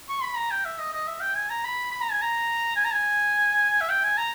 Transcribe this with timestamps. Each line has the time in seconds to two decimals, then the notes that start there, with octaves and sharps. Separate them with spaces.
0.09 C#6
0.23 B5
0.36 A#5
0.51 G5
0.65 E5
0.79 D#5
0.93 D#5
1.08 E5
1.21 G5
1.36 G#5
1.50 A#5
1.64 B5
1.92 B5
2.02 A#5
2.12 G#5
2.22 A#5
2.76 G#5
2.85 A#5
2.92 G#5
3.81 E5
3.89 G5
4.04 G#5
4.18 A#5